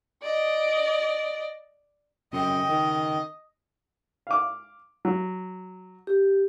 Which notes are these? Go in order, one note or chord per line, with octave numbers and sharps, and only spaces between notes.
D5 D#5
F#2 C#3 C4 A4 D#5 G5
D#3
F5 D6
F#3
G4